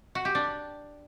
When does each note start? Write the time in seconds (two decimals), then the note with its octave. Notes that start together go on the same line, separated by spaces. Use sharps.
0.15 F#4
0.25 G4
0.35 D4